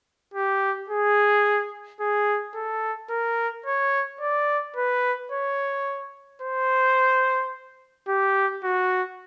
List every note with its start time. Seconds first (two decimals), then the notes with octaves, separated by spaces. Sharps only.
0.34 G4
0.90 G#4
2.00 G#4
2.55 A4
3.10 A#4
3.66 C#5
4.21 D5
4.76 B4
5.32 C#5
6.42 C5
8.08 G4
8.64 F#4